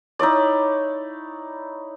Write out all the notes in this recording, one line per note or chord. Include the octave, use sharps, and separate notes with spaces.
D#4 E4 C#5 D5